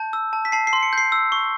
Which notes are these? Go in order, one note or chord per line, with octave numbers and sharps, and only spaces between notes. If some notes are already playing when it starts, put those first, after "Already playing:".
Already playing: A5 G6
E6
A5
B6
A5 C7
C7
C6
C#7
G6 C7
E6
C#6